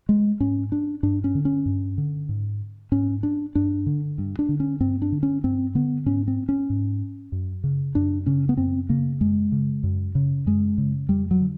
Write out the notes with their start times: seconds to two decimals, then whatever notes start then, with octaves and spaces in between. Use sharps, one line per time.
0.09 G#3
0.40 G#2 C#4
0.72 D4
1.03 G2 D4
1.24 C#4
1.35 D3
1.45 C#4
1.66 G2
1.98 D3
2.29 G#2
2.92 G#2 C#4
3.23 D4
3.55 G2 D4
3.86 D3
4.18 G2
4.39 D4
4.49 D3
4.60 C#4
4.80 G2 C4
5.02 D4
5.12 D3
5.23 C#4
5.44 G2 C4
5.75 D3 B3
6.06 G#2 C#4
6.28 C4
6.49 C#4
6.70 G#2
7.32 F#2
7.64 C#3
7.95 F#2 D4
8.26 C#3 C#4
8.49 B3
8.57 F#2 C4
8.89 C#3 A#3
9.21 F#2 G#3
9.52 C#3
9.83 F#2
10.15 C#3
10.46 F#2 G#3
10.78 C#3
11.09 F2 G3
11.31 F#3
11.41 D3